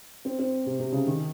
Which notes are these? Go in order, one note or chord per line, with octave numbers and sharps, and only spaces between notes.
C4
C4
C3
C3
C#3
D#3